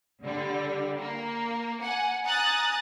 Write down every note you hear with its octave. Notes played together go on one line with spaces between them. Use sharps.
D3 G3
A#3
F#5 G#5
G#5 A#5 D#6 F#6 A6